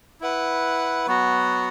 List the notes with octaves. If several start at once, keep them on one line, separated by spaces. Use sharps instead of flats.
E4 B4 F#5
F#3 B3 F#4